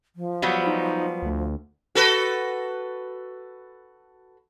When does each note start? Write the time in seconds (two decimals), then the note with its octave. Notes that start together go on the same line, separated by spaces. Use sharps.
0.16 F3
0.42 F#3 G3 B3
0.67 D#4
1.22 D2
1.95 F#4 A4 B4